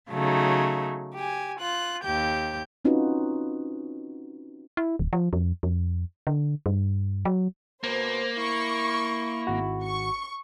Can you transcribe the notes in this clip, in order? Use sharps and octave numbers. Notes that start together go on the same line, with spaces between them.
C#3 F#3 A3 D#4
G4 G#5
F4 F#6
D#2 G4 G6
C4 C#4 D#4 F4 F#4 B4
E4
D1
F3
F2
F2
D3
G2
F#3
B2 A#3 C5
E4 C#6
G#1 F#4
C#6